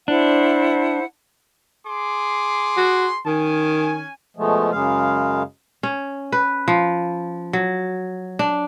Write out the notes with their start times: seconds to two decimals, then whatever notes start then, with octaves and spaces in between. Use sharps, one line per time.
0.08 D4 E4 C5 F#5
1.87 G#4 C6 D6
2.77 F#4
3.26 D#3 C#4 G#5
4.37 B2 F3 G#3 A3
4.71 F#2 C#3 G#3 F5
5.83 C#4
6.32 B4
6.68 F3
7.53 F#3
8.39 D4